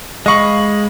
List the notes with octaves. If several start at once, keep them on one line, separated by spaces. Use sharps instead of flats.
G#3 D#5 F5 B5 C#6